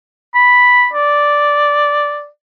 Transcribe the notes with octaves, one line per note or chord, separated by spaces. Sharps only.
B5
D5